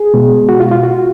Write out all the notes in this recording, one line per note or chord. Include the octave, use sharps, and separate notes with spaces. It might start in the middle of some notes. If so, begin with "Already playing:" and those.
Already playing: G#4
B2 G#3
F#4
F4
F4
F#4